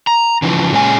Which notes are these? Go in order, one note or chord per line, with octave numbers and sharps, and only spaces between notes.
A#5
C#3 E3 F3
A#2 G#3 C#4 G#4 G#5